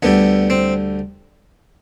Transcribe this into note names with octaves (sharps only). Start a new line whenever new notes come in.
D2 D3 G3 B3
C4